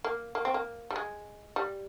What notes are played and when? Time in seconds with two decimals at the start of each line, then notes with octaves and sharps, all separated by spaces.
0.04 A#3
0.35 A#3
0.45 C4
0.54 A#3
0.90 G3
0.96 G#3
1.56 G3